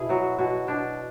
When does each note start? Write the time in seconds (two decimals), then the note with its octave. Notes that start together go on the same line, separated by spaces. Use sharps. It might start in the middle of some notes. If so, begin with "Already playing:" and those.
Already playing: B2 E4 G#4
0.09 F#3 F#4
0.39 B2 F#4
0.68 B2 D4